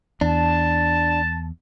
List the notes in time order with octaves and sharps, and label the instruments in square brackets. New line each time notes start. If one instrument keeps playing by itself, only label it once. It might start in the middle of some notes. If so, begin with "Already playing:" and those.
[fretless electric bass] E2 [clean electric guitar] D4 [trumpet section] A5